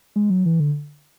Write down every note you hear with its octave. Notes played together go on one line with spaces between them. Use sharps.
G#3
F#3
E3
D3